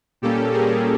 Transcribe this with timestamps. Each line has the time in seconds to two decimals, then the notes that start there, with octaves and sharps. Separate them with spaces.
0.22 A#2 G3 A#3 C#4 G4 A4
0.53 G#4 A#4